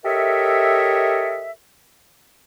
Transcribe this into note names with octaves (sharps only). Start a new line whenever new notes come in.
G4 A4 A#4 C#5 D#5 E5